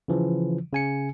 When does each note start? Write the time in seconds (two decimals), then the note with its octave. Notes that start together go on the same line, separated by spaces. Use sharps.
0.08 C#3 E3 F3
0.73 C#3 G#5 C#7